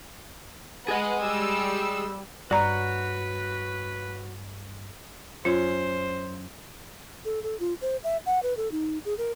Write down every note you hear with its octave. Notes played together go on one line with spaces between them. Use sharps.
G#4 B4 D#5 F#5
G3 E6
G2 F#4 B4 C#5 D5 F#5 A#5
F#2 C#4 F4 C5
A4
A4
F4
C5
E5
F#5
B4
A4
D#4
G#4
A#4